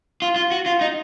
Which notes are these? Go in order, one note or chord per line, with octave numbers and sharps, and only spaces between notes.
F4
F4
F#4
F4
D#4